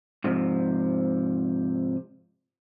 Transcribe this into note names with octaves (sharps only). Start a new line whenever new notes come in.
G#2 C3 F3